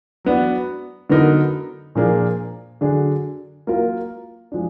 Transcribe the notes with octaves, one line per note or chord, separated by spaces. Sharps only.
F#3 B3 D4
D3 F#3 B3 D#4 A#4
A#2 F3 A#3 D4 G#4
D3 F#3 D4 G#4
F#3 A#3 F4 A#4
F3 G#3 D4